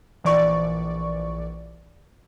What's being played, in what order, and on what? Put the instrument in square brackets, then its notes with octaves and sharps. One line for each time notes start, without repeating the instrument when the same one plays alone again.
[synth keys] A#1 E3 D5 C#6